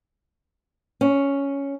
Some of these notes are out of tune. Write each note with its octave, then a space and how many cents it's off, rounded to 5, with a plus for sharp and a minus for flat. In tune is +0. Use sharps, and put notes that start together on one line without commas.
C#4 +5